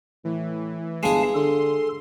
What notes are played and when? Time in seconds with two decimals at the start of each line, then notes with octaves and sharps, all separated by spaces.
0.25 A2 E3
1.03 G1 G#3 G#4 F5 A5
1.35 D3 A4 C6